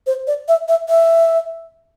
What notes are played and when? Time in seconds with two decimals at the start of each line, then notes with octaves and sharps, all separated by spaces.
0.07 C5
0.27 D5
0.48 E5
0.68 E5
0.89 E5